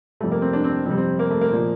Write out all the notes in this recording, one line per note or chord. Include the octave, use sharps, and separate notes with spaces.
F2 C3 G3 A3
A#3
C4
D4
C4
F2 C3 G3 C4
C4
A#3
A3
A#3
A#2 F3